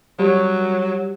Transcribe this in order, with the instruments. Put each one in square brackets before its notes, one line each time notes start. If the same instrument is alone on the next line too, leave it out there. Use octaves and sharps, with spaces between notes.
[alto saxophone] F#3 [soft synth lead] G3